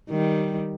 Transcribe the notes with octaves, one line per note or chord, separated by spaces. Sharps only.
D#3 G3